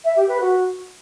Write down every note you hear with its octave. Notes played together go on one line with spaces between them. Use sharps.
E5
G4
B4
F#4